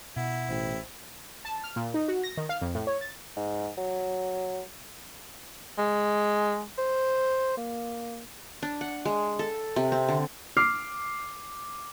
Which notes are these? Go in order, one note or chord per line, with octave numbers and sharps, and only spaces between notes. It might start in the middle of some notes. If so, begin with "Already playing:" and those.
B2 E4 F#5
A1 C5 G5
A5
F6
A#2
D#4
F#4
A#6
D#3
F5
F2
A2
C#5
A6
G#2
F#3
G#3
C5
A#3
D4
F#5
G#3
A4
C3
C4
D3
D6 F6 C7